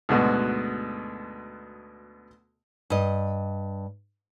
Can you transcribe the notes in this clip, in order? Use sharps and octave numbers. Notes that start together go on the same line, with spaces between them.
D2 G#2 B2 B3 F#4
G2 D#5